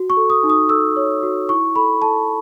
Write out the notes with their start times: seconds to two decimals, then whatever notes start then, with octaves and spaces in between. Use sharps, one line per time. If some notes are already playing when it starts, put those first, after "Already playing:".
Already playing: F#4
0.10 C#6
0.17 A4
0.30 D#6
0.43 D#4
0.50 D#6
0.69 A4 E6
0.96 C#5
1.23 F#4
1.49 E4 C#6
1.76 A4 B5
2.02 A4 A5